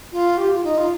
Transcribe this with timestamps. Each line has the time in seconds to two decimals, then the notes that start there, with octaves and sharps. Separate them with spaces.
0.12 F4
0.38 G4
0.52 F4
0.64 D#4
0.78 F4